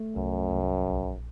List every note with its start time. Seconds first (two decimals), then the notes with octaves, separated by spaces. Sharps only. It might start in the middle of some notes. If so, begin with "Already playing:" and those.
Already playing: A3
0.16 C2 F#2
0.51 C2
0.87 A#1